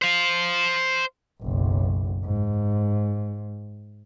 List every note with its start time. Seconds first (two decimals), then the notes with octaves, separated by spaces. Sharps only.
0.02 C5 F5
1.41 F#1 B1
2.24 G#2